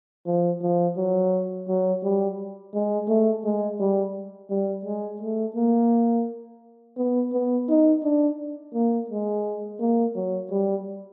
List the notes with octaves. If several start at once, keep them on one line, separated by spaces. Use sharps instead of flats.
F3
F3
F#3
F#3
G3
G#3
A3
G#3
G3
G3
G#3
A3
A#3
B3
B3
D#4
D4
A#3
G#3
A#3
F#3
G3